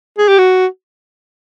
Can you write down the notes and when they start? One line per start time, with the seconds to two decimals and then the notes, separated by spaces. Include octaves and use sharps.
0.18 G#4
0.28 G4
0.38 F#4